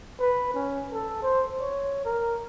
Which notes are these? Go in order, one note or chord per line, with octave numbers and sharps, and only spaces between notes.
B4
C#4
A4
C5
C#5
A#4